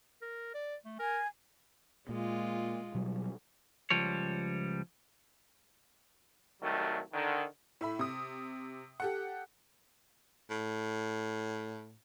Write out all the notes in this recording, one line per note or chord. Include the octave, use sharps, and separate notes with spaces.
A#4
D5
A3
A#4 G#5
A#2 G#3 F4
B2 F#3 G3
C#2 F3 G3 C#5
C2 D#3 F#3 G3 A3
D3 D#3
A2 E5 B5
C3 D#6
G4 A4 F#5
A2